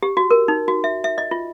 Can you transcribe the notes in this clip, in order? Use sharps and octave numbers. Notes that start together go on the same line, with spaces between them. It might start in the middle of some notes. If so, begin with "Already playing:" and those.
G4
F#4
A#4
D#4
F#4
E5
E5
D#5
F4